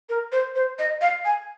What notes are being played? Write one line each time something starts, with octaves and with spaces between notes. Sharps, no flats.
A#4
C5
C5
D#5
F5
G#5